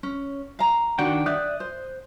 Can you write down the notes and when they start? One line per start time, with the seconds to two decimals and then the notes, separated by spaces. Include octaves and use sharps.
0.03 C#4
0.59 F5 A#5
0.99 D#3 D4 F#4 F#5 G5
1.26 D5 E5 D#6 F#6 G6
1.60 C5